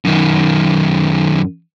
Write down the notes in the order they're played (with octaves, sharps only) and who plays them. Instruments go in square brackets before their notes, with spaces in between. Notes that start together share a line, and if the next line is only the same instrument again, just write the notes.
[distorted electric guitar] F#2 D#3